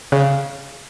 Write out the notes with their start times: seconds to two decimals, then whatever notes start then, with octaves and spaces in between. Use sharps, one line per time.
0.12 C#3